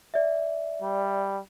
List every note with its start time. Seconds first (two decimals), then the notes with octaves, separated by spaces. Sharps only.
0.14 D5 E5
0.82 G3